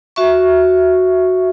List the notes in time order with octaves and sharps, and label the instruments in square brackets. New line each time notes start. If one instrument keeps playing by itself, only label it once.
[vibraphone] F#4 E5 C#6